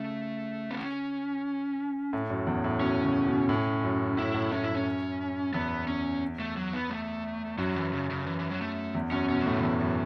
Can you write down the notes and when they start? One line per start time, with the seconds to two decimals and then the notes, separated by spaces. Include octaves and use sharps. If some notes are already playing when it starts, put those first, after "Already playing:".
Already playing: C#3 A3
0.71 B3
0.77 C#4
2.13 A2
2.30 F#2
2.47 E2
2.64 A2
2.81 B2 C#4
3.04 C#3
3.27 B2
3.49 A2
3.83 F#2
4.18 A2 E4
4.34 A2
4.51 A2 C#4
4.63 E4
4.69 F#2
4.76 C#4
5.53 E2 B3
5.87 C#4
6.40 A3
6.57 F#3
6.73 B3
6.90 A3
7.58 F#2 F#3
7.76 E3
7.93 C#3
8.10 C#3
8.27 E3
8.39 E3
8.50 F#3
8.61 A3
8.95 E2
9.11 F#2 C#4
9.29 B2 C#4
9.41 F#3
9.46 A2 A3
9.55 C#3
9.62 E2 E3
9.80 F#2